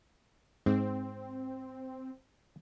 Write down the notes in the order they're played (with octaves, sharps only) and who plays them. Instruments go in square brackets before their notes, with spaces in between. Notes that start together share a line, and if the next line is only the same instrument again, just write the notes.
[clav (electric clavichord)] G#2 [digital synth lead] C4